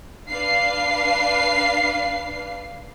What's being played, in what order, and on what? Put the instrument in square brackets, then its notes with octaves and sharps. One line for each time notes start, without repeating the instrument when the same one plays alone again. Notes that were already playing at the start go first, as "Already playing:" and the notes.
[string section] D4 B4 F5 C7